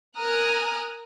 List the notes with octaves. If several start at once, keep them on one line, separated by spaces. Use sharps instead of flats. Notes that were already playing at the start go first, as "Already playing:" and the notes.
A#4 G#5 A#5 D#6 F6 F#6